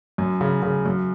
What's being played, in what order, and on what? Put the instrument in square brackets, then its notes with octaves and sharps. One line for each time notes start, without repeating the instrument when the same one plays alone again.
[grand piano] F#2
C#3
C#3
F#2